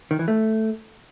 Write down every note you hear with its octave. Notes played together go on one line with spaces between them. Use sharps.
D#3
E3
A3